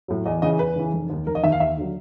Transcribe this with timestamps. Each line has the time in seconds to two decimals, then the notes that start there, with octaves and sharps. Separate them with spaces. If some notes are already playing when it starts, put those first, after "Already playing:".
0.08 A2 F#3
0.26 E2 D#5
0.42 C#3 E3 D#5
0.59 E2 B4
0.76 C#3 E3
0.93 F1
1.10 D#2 D#3
1.27 F1 A#4
1.35 D#5
1.43 D#2 D#3 E5
1.52 F5
1.60 D#2 E5
1.77 D3 F#3